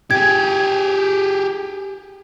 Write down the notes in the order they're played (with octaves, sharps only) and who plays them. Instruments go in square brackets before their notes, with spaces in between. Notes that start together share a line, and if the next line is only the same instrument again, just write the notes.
[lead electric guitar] G4 G#4 [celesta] G#6